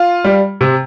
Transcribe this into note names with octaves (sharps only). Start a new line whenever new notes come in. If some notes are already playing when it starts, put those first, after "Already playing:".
Already playing: F4
G3
C3